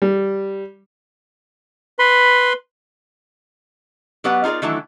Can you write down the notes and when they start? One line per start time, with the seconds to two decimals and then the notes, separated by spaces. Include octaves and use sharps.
0.02 G3
1.99 B4 B5 C6
4.24 F#3 B3 G4 B4 D5 F#5
4.44 D#4 F4 G#4 A#4 D5
4.62 D#3 E3 F#3 A3 D4 E4